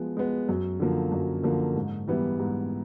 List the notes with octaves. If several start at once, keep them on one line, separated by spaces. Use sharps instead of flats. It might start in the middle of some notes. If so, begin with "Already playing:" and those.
Already playing: F3 G#3 B3
G#3 B3
F#2
D3 F3 A#3
F#2
D3 F3 A#3
G#2
E3 G3 B3 E4
G#2